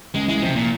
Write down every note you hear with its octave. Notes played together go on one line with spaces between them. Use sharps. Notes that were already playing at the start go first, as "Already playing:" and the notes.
C#2 G#3
E3 G#3
C3 F3
A#2